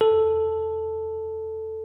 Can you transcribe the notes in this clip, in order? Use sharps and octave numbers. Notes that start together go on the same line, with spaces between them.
A4